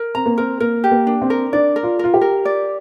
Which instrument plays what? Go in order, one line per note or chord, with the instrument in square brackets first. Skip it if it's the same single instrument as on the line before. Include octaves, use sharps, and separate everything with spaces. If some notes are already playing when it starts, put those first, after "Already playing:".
Already playing: [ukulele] A#4
[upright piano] C4 [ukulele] A#5
[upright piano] A#3
[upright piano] C4 [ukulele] A#4
[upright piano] A#3 [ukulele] A#4
[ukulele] G4
[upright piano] A#3
[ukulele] D4
[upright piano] C4
[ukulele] A#4
[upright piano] D4 [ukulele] D5
[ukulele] A#4
[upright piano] F4
[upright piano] F4 [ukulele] A#4
[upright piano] G4
[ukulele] A#4
D5